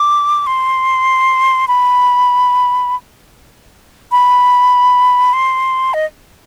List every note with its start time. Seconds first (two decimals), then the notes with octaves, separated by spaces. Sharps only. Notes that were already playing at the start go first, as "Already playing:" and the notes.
Already playing: D6
0.47 C6
1.68 B5
4.11 B5
5.33 C6
5.94 D#5